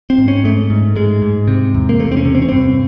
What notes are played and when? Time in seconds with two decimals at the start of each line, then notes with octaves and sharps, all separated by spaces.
0.10 C4
0.18 G#2
0.28 C#4
0.44 G#2 A3
0.70 G#2
0.96 G#2 G#3
1.22 G#2
1.48 C3
1.74 E2
1.89 A#3
1.99 C3 A3
2.12 C4
2.17 C#4
2.25 C3
2.35 C4
2.42 C#4
2.49 G2 C4